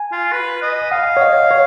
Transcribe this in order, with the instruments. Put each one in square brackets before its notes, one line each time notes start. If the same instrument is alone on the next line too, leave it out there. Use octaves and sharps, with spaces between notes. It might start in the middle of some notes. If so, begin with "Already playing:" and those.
Already playing: [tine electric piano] G#5
[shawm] F4
B4
D#5
[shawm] F5 [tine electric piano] F#5
[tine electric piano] C#5
D#5
C#5